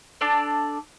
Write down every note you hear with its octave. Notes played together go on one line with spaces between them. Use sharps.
D4 A4 D5